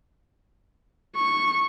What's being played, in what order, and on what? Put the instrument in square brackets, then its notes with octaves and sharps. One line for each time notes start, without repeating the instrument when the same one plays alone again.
[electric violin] C#6